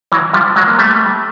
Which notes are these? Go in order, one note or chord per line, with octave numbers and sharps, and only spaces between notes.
E3 F#3
F3 G3
F#3 G#3
A#3
G3 A3